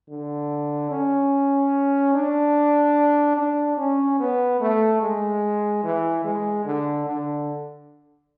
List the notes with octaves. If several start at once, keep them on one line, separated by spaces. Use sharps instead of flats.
D3
C#4
D4
D4
C#4
B3
A3
G#3
E3
G#3
D3
D3